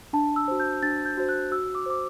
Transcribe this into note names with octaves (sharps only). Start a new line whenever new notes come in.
D4 A5
E6
F#4 C5
G6
D4 A6
G6
F#4 C5
F#6
F#4 E6
D6
C5 D6